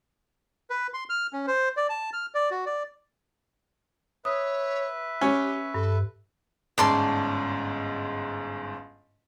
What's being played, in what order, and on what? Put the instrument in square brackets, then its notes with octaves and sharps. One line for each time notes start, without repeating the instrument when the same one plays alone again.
[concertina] B4
C6
F6
C#4
C5
D5
A5
F6
D5
F#4
D5
[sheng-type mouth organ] B4 E5 [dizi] C#5 [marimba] D#6
[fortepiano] C#4 [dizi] G4
[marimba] G2 [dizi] A4
[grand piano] G1 G#2 C#4 [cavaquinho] D5 A5 C6